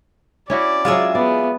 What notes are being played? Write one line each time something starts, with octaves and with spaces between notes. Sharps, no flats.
C#4 E4 F#4 D5
F#3 G#3 F4 G#4 E5
B3 D5